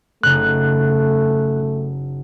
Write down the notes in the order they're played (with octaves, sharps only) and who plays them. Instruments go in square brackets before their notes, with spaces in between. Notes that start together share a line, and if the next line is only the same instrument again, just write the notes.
[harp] F#1 C#3 D#4 [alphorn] A3 [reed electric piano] F#6